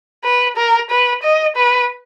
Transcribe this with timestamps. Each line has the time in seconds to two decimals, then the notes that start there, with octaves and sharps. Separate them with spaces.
0.24 B4
0.57 A#4
0.90 B4
1.23 D#5
1.56 B4